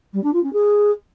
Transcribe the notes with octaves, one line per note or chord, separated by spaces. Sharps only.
G3
D4
F4
C#4
G#4